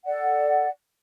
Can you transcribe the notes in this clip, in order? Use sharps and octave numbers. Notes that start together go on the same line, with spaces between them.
A4 D5 F#5